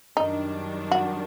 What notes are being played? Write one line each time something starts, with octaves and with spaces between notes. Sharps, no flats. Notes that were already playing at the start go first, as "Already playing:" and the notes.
F#2 D#3 G3 D4 D#4
F#4